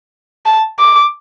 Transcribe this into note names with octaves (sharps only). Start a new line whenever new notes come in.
A5
D6